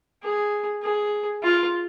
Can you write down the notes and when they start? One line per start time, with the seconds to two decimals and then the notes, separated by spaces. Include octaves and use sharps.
0.23 G#4
0.83 G#4
1.43 F4